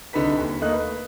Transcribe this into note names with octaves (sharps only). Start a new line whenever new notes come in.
C2 D3 D#4 B4 B6
D#2
A3 A#3 D#4 D#5 D#6 F#6
B4